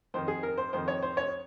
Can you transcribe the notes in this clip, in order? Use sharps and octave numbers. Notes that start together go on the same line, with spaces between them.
F2 D#3 C5
G#4
A#4
C5
F2 D#3 C5
C#5
C5
C#5